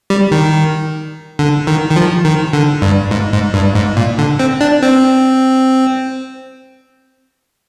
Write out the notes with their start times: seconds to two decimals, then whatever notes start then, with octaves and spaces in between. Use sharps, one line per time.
0.10 G3
0.31 D#3
1.39 D3
1.67 D#3
1.90 D#3
1.96 F3
2.25 D#3
2.53 D3
2.82 G2
3.11 G#2
3.32 G#2
3.54 G2
3.75 G#2
3.97 A#2
4.18 D3
4.39 C4
4.61 D4
4.82 C4